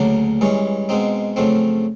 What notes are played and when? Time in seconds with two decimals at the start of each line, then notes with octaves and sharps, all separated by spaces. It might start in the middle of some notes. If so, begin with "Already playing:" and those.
Already playing: D2 C#3 F#3 A#3 D4
0.41 G2 E3 G#3 C#4
0.89 B2 G#3 C4 D#4
1.36 F#2 C#3 F3 A3 C4